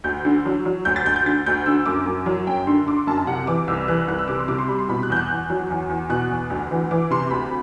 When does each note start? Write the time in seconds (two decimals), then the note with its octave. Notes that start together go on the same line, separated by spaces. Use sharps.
0.04 D2 G6
0.25 D3
0.45 F#3
0.65 F#3
0.85 D2 G6
0.96 A6
1.05 D2 G6
1.16 G6
1.26 D3 A6
1.46 D2 G6
1.66 D3 E6
1.86 F#2 D6
2.06 F#2
2.26 F#3
2.47 F#2 G5
2.67 D3 C6
2.87 D3 D6
2.97 C6
3.07 F#2 A5
3.18 A5
3.27 C3 F#5
3.47 E3 D6
3.67 C2 E6
3.88 E3 F#6
4.08 C2 F#6
4.19 E6
4.28 C3 D6
4.39 C6
4.48 C3 D6
4.58 C6
4.68 G3 B5
4.79 C6
4.89 B2 B5
5.03 F#6
5.10 E2 G6
5.16 F#6
5.30 E2
5.50 F#3
5.70 E2
5.89 E2
6.09 B2 F#6
6.30 E2
6.50 D2
6.71 E3
6.91 E3 D6
7.11 C3 C6
7.31 D2 B5